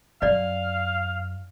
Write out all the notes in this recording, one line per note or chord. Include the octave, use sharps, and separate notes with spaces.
F#2 D5 D#5 F5